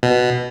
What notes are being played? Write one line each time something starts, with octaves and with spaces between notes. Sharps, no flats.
B2